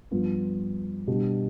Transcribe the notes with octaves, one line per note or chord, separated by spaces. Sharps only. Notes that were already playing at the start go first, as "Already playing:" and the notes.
G2 F3 B3 F4
B2 G3 D4